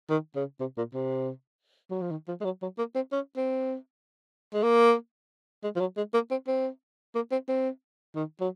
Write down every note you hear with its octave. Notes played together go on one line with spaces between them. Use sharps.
D#3
C#3
C3
A#2
C3
F#3
F3
D#3
F3
G#3
F#3
F#3
A#3
C4
C#4
C4
G#3
A#3
G#3
F3
F#3
G#3
A#3
C4
C4
A#3
C4
C4
D#3
F#3